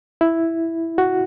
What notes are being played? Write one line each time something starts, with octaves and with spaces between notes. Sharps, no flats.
E4
F#4